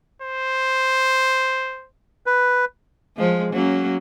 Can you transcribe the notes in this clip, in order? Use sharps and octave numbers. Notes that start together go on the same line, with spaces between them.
C5
B4
F3 G#3
F#3 A#3 C#4